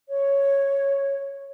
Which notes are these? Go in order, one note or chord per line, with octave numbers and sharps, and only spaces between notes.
C#5